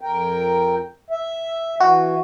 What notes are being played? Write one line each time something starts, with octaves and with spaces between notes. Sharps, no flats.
F2 A#4 G5
E5
E3 F#4